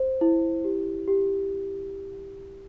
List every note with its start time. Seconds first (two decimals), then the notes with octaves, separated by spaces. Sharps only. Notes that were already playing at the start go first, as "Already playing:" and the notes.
Already playing: C5
0.21 E4
0.64 G4
1.08 G4